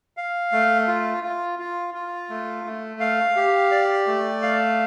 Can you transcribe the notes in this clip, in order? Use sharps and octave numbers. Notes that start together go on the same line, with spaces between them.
F5
A3
F4
F4
F4
F4
A3
A3
F5
G4
D5
A3
F5